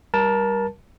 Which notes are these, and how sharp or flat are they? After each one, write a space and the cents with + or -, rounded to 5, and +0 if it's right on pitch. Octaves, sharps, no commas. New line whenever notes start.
G3 +0 A#4 +25 A5 +0